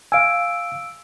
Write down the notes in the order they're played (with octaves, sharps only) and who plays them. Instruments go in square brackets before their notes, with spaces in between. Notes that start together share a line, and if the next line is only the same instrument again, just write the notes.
[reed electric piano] F5 G#5 [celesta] E6 D7